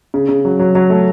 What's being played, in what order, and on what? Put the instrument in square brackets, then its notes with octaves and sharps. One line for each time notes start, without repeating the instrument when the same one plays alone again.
[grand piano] C#3
C#3
F#3
F#3
F#3
A3